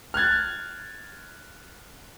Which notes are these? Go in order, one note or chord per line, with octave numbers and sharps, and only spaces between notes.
F6 F#6 G#6 A6